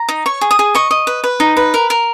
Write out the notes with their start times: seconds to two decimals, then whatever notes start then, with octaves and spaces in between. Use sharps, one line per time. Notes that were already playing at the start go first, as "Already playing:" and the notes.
Already playing: A#5
0.09 D#4
0.26 C#5 C#6
0.41 G#4
0.51 D#6
0.59 G#4
0.75 D#5 C#6
0.91 D#5
1.07 B4
1.24 B4
1.40 D#4
1.57 B4
1.74 A#4
1.90 A#4